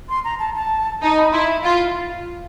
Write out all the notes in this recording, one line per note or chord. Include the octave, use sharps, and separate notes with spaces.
C6
A#5
A5
A5
D#4 A5
B5
E4 C6
B5
F4 C6